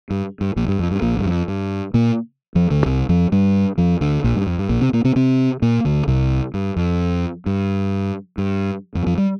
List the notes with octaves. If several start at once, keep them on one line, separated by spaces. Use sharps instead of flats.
G2
G2
A#1 A#2
G2
F2
G2
A#1 A#2
G2
F2
G2
A#2 A#3
F2 F3
D2 D3
C2 C3
F2 F3
G2 G3
F2 F3
D2 D3
A#1 A#2
G2
F2
G2
A#1 A#2
C3 C4
A#2 A#3
C3 C4
C3 C4
A#2 A#3
D2 D3
C2 C3
G2
F2
G2
G2
F2 F3
F2 F3
G3